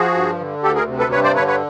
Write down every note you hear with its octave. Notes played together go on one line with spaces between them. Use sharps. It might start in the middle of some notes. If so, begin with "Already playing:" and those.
Already playing: F3 F#4 G#4
G2
D3
D2 G4 A4
G#4 A#4
C3
A4 B4
G2 B4 C#5
C5 D5
D3 B4 C#5
B4 C#5